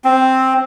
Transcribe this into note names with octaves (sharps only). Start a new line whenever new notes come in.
C4